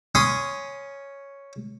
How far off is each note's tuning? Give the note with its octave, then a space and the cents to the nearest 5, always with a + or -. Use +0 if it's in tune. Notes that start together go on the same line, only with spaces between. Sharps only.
C#4 +0 C6 -20 D#6 +0